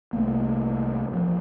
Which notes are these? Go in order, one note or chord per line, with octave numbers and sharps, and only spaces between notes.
C2 A3 A#3
A1 F3